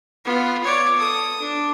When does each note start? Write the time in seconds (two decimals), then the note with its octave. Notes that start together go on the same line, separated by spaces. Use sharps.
0.25 B3 F4
0.64 C#5 D5
0.96 A4 D#6
1.41 D4